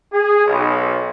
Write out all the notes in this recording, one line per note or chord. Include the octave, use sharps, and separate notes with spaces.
G#4
B1